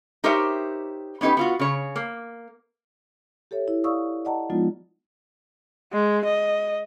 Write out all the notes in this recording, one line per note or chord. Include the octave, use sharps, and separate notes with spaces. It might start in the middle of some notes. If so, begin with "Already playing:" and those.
D#4 G4 A#4 C5 C#5 E5
B3 C#4 D#4 G4 B4
B3 F4 F#4
C#3 C#5
A#3
G4 A4 C#5 E5
E4
D5 F5 C#6 D#6 E6
D5 D#5 F#5 A5 A#5
F3 G#3 B3 D#4 F4
G#3
D#5